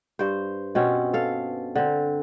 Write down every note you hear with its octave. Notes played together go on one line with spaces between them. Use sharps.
G2 C5
B2 C4 C#4
A4 F5
D3 C4